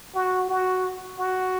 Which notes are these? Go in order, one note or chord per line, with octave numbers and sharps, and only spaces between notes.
F#4
F#4
F#4